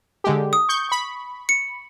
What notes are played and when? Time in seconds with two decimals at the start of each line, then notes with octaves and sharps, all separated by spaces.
0.24 D3 G#3 G4
0.53 D#6
0.69 C#6 G6
0.89 B5 C#6
1.49 C#7